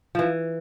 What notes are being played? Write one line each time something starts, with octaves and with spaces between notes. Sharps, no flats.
E3 F3